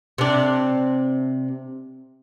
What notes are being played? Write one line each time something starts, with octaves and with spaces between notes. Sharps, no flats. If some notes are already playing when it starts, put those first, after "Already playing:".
C3 D4